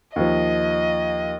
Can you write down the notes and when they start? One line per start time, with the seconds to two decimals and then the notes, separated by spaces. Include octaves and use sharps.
0.16 D#2 F3 D#5